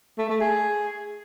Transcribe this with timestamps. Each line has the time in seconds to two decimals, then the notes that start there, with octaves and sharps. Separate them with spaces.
0.18 A3
0.29 A3
0.40 G#4